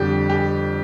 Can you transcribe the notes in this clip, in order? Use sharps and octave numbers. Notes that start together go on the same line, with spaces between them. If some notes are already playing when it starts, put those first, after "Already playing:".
Already playing: F2 D3 G3 G4
G4